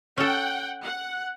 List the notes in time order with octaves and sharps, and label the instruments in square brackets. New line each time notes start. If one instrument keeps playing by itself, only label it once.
[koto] C#4 A4 [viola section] F#5 G5
[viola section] F#5